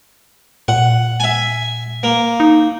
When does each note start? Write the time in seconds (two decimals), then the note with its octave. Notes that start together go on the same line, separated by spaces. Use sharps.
0.68 A#2 F#5
1.20 E5 G#5
2.03 A#3
2.40 D#4